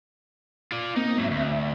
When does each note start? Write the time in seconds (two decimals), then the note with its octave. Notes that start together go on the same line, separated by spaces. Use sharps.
0.72 F4 D5
0.96 A#3 C4 D#4
1.18 G#2 F#3 E5
1.31 D2 E5